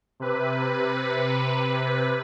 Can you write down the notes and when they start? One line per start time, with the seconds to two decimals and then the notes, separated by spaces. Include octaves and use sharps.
0.20 C3 B4